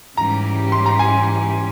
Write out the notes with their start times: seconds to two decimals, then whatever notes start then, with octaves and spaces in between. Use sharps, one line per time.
0.17 G#2 E3 G3 C#4 G4 A#5
0.72 C6
0.86 A#5
0.99 G#5